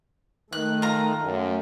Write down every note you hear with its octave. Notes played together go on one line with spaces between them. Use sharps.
D#3 A3 F#6
F4 A#5
F#2